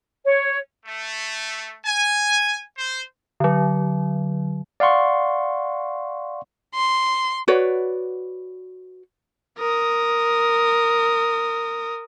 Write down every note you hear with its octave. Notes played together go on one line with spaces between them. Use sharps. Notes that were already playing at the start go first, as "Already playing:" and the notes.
C#5
A3
G#5
C5
D3 F#3
D5 F5 F#5 C6 C#6
C6
F#4 B4 C#5 D5
A#4 D#6